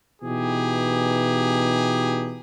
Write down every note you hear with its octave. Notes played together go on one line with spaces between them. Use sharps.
B2 E3 D#4 G4 G#4